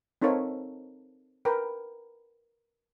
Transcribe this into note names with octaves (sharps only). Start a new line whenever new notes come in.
C4 D#4 A4 A#4 C#5 F5
A#4 B4 G5